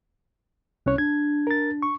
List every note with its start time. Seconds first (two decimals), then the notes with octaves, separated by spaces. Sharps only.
0.86 C2 C#4 C#5 F#6
0.98 D4 G#6
1.47 A#4 A6
1.82 C#6